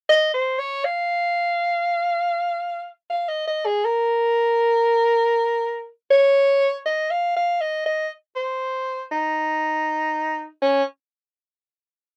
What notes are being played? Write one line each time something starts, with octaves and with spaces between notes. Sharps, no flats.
D#5
C5
C#5
F5
F5
D#5
D#5
G#4
A#4
C#5
D#5
F5
F5
D#5
D#5
C5
D#4
C#4